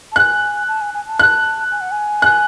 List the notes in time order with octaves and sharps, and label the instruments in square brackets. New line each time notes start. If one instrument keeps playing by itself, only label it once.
[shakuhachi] A5
[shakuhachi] G#5 [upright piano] F#6
[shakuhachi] A5
G#5
G#5
A5
[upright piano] F#6
[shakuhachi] G#5
F#5
G#5
[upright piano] F#6